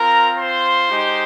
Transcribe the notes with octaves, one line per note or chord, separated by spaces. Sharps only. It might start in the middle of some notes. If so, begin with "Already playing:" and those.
Already playing: C4 F4 A#4 A#5
C5 C6
G#3 D#4 G4